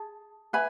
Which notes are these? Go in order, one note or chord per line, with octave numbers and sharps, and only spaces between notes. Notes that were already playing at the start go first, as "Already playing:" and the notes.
Already playing: G#4 A5
B4 E5 G#5 B5